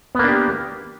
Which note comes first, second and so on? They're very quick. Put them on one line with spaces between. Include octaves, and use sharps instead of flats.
B3 A#3 D4 G4